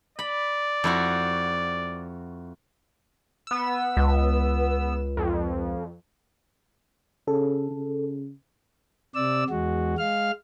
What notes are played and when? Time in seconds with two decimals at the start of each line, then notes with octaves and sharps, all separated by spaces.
0.19 D5 B5
0.84 F2 E4 F#4
3.47 B3 E6
3.97 C#2
5.17 F2
7.28 C#3 A4
7.71 C#3
9.15 C3 D5 E6
9.50 E2 G#3 F#4
9.98 G#3 F5 F6